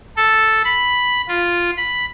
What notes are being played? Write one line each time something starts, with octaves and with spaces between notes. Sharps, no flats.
A4
B5
F4
B5